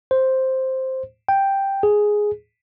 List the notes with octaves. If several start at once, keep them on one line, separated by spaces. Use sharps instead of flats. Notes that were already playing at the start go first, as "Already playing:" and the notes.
C5
G5
G#4